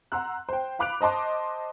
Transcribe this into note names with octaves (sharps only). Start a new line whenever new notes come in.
F#5 A#5 C6 E6 F#6
C5 G5
F5 B5 D6 F#6 D7 F7
C5 D#5 A5 C6 D6